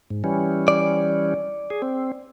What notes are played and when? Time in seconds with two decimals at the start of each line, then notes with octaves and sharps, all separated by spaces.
0.10 G#2
0.24 E3 G3 C#4
0.68 D5
1.70 G#4
1.82 C4